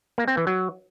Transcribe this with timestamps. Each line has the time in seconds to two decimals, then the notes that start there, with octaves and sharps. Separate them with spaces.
0.18 A#3
0.28 C4
0.37 E3
0.47 F#3